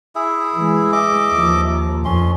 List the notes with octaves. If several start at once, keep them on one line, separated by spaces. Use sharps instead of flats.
E4 G#4 E5
E3 G#3
D#5 E5 D6
D#2 F3
F2 C#4 C6